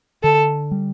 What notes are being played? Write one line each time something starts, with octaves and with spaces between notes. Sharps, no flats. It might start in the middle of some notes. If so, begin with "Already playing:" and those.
D3 A4
G3